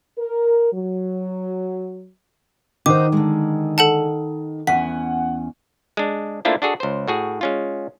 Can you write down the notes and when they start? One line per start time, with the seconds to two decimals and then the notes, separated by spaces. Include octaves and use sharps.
0.18 A#4
0.74 F#3
2.86 D#3 D#4 F#4 C5 D6
3.12 D3 G#3
3.78 A4 F#5 A5
4.67 E2 C#4 F#5 G#5 B6
5.97 G#3 D4
6.45 A3 A#3 D4 E4 F4 C5
6.62 D4 F#4 G#4 A4
6.80 C#2 C5
7.08 A2 F#4 G#4
7.41 G#3 C#4 F4